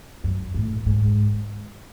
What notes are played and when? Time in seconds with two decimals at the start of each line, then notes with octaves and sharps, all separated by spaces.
0.24 F#2
0.54 A2
0.86 G#2